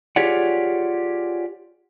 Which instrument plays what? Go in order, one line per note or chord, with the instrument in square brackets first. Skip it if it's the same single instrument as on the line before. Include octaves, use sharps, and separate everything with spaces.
[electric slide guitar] F4 G4 G#4 C#5 D5 F#5